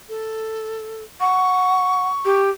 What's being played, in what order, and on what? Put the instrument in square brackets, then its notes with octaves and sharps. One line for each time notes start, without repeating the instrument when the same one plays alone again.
[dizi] A4
[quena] F#5 [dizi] C#6
[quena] G4